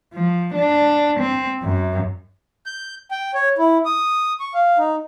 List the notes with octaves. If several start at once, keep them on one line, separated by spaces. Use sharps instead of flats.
F3
D4
C4
F#2
G6
G5
C#5
E4
D#6
C#6
F5
D#4